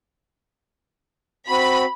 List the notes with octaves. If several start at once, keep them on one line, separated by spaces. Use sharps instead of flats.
C4 F#4 B5